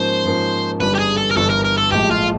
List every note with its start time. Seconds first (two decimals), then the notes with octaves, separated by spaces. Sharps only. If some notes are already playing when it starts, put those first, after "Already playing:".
Already playing: G#2 F3 A#3 C#4 C5
0.25 G#2 F3 A#3 C#4
0.81 G1 G2 E3 G3 B4
0.95 G4
0.99 G#4
1.17 A4
1.31 A#4
1.36 G1 G2 E3 G3 A4
1.50 A#4
1.65 A#4
1.78 A4
1.92 A#1 A2 F3 G#3 G4
2.11 F4